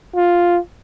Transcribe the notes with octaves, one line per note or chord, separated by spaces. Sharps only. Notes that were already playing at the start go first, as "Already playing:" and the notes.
F4